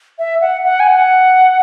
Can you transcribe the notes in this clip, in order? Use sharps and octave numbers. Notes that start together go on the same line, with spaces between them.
E5
F#5
F#5
G#5
F#5